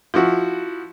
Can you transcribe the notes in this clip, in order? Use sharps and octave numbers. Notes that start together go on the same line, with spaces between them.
F3 E4 F#4